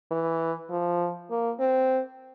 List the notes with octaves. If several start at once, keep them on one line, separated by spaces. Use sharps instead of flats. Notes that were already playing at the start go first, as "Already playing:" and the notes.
E3
F3
A#3
C4